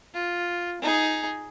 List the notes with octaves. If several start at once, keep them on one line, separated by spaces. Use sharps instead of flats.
F4
D#4 G#4